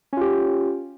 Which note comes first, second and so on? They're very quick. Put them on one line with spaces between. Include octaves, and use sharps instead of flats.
C#4 F4 G4